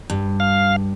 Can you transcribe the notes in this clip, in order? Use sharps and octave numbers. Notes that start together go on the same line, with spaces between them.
G2
F5